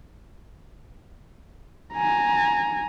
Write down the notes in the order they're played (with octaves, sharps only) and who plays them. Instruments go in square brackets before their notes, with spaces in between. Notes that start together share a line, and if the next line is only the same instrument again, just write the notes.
[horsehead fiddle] G#5 A#5